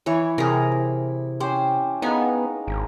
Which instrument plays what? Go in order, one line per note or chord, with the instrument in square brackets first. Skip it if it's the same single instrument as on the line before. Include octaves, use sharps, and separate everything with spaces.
[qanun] E3 C#5 [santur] E4 B5
[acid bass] C3 [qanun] G#4 A#4
[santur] E4
[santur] C#4 G4 [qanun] C5
[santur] G#3 A#4 F5 [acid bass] B3 [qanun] D#4 G#5
[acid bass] G#1